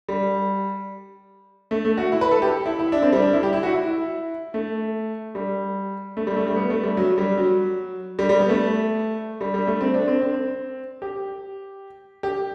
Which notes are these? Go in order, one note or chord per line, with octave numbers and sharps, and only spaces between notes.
G3
A3
A3
F#4
E4
B4
A4
G4
E4
E4
D4
C4
G3
D4
E4
G4
E4
F#4
E4
A3
G3
A3
G3
A3
G3
B3
A3
G3
F#3
G3
F#3
G3
G3
B3
A3
G3
G3
A3
C4
D4
C4
C4
G4
G4